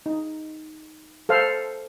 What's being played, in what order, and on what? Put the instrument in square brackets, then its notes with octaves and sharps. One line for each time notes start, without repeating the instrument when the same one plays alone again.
[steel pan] D#4
A4 C5 F5